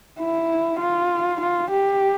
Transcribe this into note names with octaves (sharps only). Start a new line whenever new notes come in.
E4
F4
F4
G4